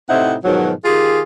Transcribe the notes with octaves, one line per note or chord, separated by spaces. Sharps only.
A2 C3 C4 D#4 E4 F#5
G#2 B2 D#3 F3 F#3
D#3 F4 G4 G#4